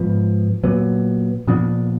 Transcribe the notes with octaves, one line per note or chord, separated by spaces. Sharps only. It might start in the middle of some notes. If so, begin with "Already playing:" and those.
Already playing: G#2 F3 B3
A#2 F#3 B3
A#2 F3 B3 D4